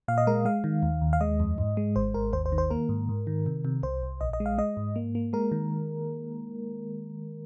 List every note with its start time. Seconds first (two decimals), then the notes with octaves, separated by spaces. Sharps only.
0.08 A#2 F5
0.18 D#5
0.27 G#3 A#4
0.45 G#3 F5
0.64 D#3
0.83 D#2
1.01 D#2
1.13 F5
1.21 G#3 D#5
1.40 F2
1.58 G#2
1.77 G#3
1.96 G#1 C5
2.14 G#1 A#4
2.33 D#2 C5
2.46 C5
2.52 D#3
2.58 C5
2.70 A#3 A#4
2.89 G#2
3.09 G#2
3.27 D#3
3.46 C3
3.65 C3
3.83 C2 C5
4.03 C2
4.21 A#1 D#5
4.33 D#5
4.40 G#3
4.46 F5
4.58 G#3 D#5
4.77 G#2
4.96 A#3
5.15 A#3
5.33 G#3 A#4
5.52 D#3